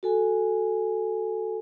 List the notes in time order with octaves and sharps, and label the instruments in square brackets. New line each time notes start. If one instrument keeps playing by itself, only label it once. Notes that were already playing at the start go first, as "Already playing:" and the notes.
[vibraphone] F#4 A4 G#5